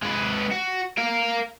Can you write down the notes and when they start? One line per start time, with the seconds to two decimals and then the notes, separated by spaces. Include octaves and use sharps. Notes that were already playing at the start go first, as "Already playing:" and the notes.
0.02 G#3 B4
0.51 F#4
0.97 A#4 F5